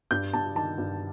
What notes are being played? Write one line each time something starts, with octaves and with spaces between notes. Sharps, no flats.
G2 G6
G2 A5
D#3 A5
G2